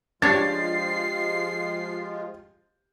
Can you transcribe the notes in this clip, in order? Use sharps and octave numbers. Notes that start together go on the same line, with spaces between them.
F3 G#3 D4 F4 G4 C#5 A6 C7